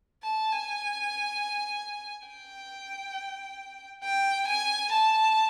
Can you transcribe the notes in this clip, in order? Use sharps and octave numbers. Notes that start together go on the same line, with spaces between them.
A5
G#5
G5
G5
G#5
A5